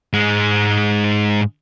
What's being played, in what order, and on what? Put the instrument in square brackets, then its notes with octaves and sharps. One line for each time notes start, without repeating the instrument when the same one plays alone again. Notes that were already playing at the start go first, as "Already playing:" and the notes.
[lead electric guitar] G#2 G#3